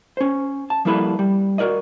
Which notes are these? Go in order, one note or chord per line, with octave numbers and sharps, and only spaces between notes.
C#4 C5
A5
F3 G3 A#3 E4 A4 B4
G3
F#4 G4 A#4 D5 D#5